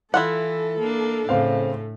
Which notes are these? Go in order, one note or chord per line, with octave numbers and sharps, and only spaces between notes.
E3 E4 F4 A4 F#5
A#3 D4
A2 C#3 C4 F5